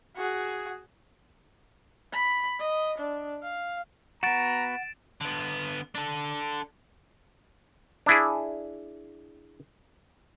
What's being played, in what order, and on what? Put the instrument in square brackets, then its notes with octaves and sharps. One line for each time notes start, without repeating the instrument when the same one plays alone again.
[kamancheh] F#4 G#4
[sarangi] B5
D#5
D4
F5
[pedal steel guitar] B3 F#4 [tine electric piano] F#5 [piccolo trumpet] A#5 [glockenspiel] A6 D7 E7
[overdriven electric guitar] D3 B3
D4 A4
[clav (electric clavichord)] D4 E4 G#4